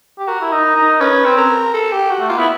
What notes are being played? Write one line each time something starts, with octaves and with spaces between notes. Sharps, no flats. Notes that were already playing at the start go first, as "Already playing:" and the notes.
G4
F#4 A#4
E4
D#4
D#4
C#4 B4
C4
A#4
A4
G4
F#4
A3
A#3 F4
B3 E4